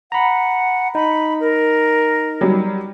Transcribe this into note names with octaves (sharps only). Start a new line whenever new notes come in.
F#5 A#5 B5
D#4 B5
A#4
F#3 G3